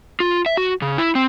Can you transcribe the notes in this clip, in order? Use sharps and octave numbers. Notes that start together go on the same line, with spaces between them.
F4
E5
F#4
C#3
E4
C4